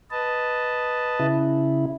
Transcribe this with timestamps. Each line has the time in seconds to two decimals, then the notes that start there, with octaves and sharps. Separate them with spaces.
0.11 B4 D#5 A5
1.20 C#3 E4